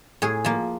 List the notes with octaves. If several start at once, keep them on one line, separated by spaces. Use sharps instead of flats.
A2 G#4
F3 A#3